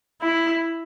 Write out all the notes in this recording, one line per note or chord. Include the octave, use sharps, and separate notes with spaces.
E4